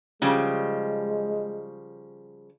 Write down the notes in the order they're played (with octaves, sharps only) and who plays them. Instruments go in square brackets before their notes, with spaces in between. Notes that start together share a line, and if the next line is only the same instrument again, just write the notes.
[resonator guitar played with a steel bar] C#3 F3 G3 [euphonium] G#3